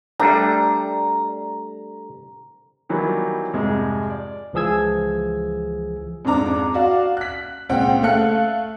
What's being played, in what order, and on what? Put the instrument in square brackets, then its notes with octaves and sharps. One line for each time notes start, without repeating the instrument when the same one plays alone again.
[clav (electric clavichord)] G3 A3 D4 [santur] A#5
[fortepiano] D#3 E3 F#3 G3 B3
F2 G#2 C3 G3 G#3
D5
[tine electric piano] C#2 E3 F3 G#4 E6 G#6
[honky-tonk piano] F2 G#2 D4 A#5 D6
F#4 D5 F5
F#6 B6
C#2 A#2 C4 F#5 G5
A3 A4 F5 F#6 C#7